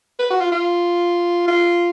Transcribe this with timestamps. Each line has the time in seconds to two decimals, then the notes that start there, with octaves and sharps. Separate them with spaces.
0.19 B4
0.30 F#4
0.40 F4
0.52 F4
1.48 F4